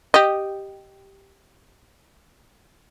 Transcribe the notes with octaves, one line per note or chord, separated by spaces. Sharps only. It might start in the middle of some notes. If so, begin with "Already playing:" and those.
G4 D#5